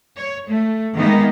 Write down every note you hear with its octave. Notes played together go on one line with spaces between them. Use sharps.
C#5
A3
D#3 E3 G#3 A#3 B3 D#4